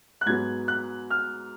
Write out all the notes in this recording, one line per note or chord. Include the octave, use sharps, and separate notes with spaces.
F#6
G#2 F#3 B3 G#6
F#6
F6